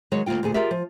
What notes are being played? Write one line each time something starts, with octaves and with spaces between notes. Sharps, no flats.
D#3 F#3 G#3 C#5
D2 A#2 A#3 F4 G5
D2 A#2 G#4 A4
F4 G4 G#4 A#4 D5 E5
F3